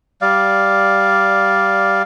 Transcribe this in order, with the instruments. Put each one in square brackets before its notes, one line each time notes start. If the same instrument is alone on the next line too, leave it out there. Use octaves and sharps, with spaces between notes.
[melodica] G3 D5 F5